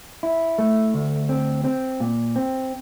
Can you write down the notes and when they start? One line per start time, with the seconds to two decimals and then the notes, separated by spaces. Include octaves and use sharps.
0.23 E4
0.58 A3
0.94 D2
1.29 C4
1.65 C4
2.00 A#2
2.36 C4